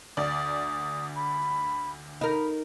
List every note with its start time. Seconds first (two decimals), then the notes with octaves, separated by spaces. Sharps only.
0.17 D2 D5 D#6
1.16 B5
2.21 D#4 A#4 B5